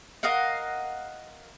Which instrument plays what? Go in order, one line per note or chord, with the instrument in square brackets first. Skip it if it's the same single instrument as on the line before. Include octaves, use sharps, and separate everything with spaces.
[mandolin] A#4 D#5 F5 F#5